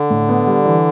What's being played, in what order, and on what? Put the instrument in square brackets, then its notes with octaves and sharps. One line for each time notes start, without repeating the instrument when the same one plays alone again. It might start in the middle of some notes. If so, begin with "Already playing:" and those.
Already playing: [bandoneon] D3
[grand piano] A2
B3
G3
E3